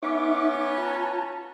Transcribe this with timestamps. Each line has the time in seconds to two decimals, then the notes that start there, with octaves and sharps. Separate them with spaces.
0.03 B3 C#4 D#4 C#5 E5 D6
0.78 F4 A5 A#5